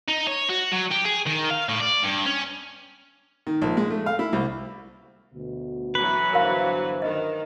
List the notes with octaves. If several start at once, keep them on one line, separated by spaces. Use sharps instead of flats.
D#4
C#5
F#4
F#3
G4
G#4
D#3
F5
A2
D5
G2
C#4
D#3
A#1
G#3
A3
F5
E4
C2
D2 B2
E3 F#3 B4
G1 D4 A#4 C5 F5
D#3 D#5